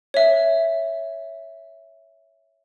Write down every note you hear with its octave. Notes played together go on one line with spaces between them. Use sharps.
C#5 E5